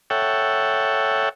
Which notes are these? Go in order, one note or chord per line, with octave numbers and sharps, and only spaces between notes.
A4 C#5 E5 F#5 G5